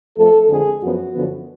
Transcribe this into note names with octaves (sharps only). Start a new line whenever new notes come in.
F2 F3 A3 A4
F2 D3 G#3 G#4
F#2 F3 B3 F#4
F#2 D3 F3 B3